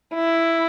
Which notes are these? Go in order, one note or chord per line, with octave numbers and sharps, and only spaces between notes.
E4